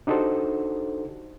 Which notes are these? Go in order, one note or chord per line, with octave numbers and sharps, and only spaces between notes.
D4 D#4 F#4 G4 A4 C5